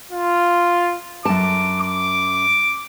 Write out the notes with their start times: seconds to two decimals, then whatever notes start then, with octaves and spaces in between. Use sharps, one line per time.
0.11 F4
1.25 F#2 A5 D6
1.81 D6